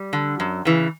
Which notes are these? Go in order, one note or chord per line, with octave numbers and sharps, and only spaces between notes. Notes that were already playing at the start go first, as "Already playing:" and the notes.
Already playing: G3
D3
F#2
C#3 E3